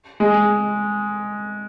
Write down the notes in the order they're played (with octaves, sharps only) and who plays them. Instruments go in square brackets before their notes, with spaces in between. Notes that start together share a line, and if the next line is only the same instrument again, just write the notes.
[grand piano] G#3